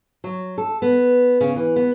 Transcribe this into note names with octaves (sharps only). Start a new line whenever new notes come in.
F#3
A4
B3
C#3
E3
B3